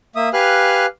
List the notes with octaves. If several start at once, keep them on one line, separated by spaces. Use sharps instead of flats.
A#3 E5 D#6
G4 B4 F5 G#5 F6 F#6